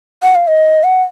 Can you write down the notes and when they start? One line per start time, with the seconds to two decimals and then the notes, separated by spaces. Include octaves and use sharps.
0.23 F#5
0.35 F5
0.47 D#5
0.84 F#5